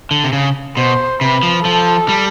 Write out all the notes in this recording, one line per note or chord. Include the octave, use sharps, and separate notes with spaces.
D3
C3
C#3
B2 C5
C3 B4
F3
F3 A4
G3